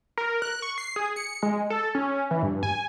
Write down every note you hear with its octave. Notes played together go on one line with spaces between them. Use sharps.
A#4
F#6
C#6
C7
G#4
C#7
G#3
A4
C#4
E3
G2
G#5